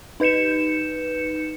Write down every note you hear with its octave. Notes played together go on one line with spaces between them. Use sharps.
D#4 B4 G6 C#7 E7